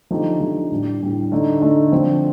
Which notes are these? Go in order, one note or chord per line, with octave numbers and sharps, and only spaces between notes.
D3 F3 A3 D#4 G4
D3 F3 A3 D#4 G4
A2 G3 D4
A2 G3 D4
D3 A3 D#4
D3 A3 D#4
D3 F3 C4 F4